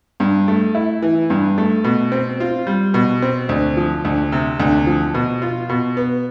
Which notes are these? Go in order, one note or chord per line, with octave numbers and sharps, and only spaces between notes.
G2
A3
E4
E3
G2
A3
B2
C4
F4
G3
B2
C4
D2
F3
D2
C3
D2
F3
B2
F4
B2
B3